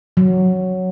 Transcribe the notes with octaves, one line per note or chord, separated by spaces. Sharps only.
F#3